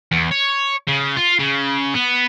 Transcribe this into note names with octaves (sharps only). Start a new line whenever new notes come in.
E2
C#5
C#3
F4
C#3
B3